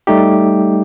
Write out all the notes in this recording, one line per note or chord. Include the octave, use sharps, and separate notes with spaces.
G3 A3 D#4 G4